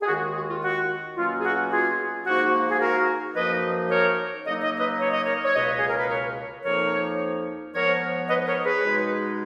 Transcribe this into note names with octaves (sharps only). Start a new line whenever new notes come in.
G#4
D#2 D#3 G#3 F#4
F#4
F4
F#4
B2 F#3 A#3 C#4 F4
G#4
F#4
F4 G#4
G#2 F3 A#3 D#4 F#4
G#4
F#4 A#4
F#2 F3 A#3 D#4 B4 D#5
A#4 C#5
C#3 F#3 A#3 D#4 D#5
D#5
B4 D#5
C#5
D#5
A#4 C#5
C#5
C#2 B2 A#3 B4 D#5
G#4
A#4
B4
A#4 C#5
F2 F3 A#3 D#4 A#4 C#5
G#2 F3 B3 A#4 C#5
B4 D#5
A#4 C#5
G#4 B4
B2 G#3 D#4